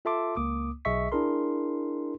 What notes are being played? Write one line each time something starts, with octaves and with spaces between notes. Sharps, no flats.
F4 A4 E5 A5 C6 D6
C#2 A#3 D6 D#6
B1 G#4 D#5 E5 C#6 B6
D4 E4 G#4 A#4 C6